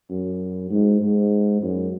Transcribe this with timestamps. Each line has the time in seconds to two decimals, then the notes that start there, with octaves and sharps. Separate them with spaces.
0.11 F#2
0.71 G#2
1.02 G#2
1.62 F#2